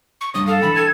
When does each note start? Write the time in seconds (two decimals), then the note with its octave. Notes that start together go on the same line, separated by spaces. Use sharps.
0.21 C#6
0.34 G3 D4 C#5 D#6
0.47 A4 F5
0.62 E3 D4 G5 B5
0.76 G#6